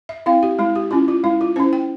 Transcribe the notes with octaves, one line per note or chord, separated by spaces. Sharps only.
E5
C4 E4 F5
G4
G#3 E4
G4
C#4 E4 F4
F4
G#3 E4
F4
C#4 E4 C5
G5